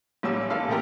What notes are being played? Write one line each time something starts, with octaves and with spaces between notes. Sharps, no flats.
A1 F#3 G3 A#3 E6
A1 A4 F5
B2 A3 A#3 C4 G4 A#4